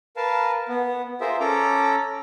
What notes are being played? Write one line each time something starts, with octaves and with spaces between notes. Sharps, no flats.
A#4 B4 F5 A5
B3
F4 G#4 A#4 C5 E5
C#4 A4 A#5 D6